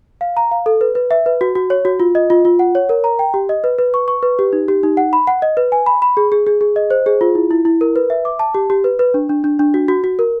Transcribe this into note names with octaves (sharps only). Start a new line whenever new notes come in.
F5
A#5
F5
A4
B4
B4
E5
B4
F#4
F#4
C#5
F#4
F4
D#5
F4
F4
F#5
C#5
A#4
A#5
G5
G4
D#5
B4
B4
C#6
C#6
B4
G4
D#4
G4
D#4
F#5
B5
F#5
D#5
B4
G#5
B5
B5
G#4
G#4
G#4
G#4
D#5
C5
G#4
F4
E4
E4
E4
A#4
B4
E5
D6
A5
G4
G4
B4
B4
D4
D4
D4
D4
F#4
F#4
F#4
A#4